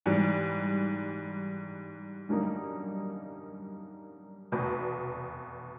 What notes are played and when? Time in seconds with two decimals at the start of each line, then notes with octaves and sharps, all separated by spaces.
0.06 G#2 E3 G3
2.29 F#2 D3 G3 A#3 D#4
4.52 F1 E2 B2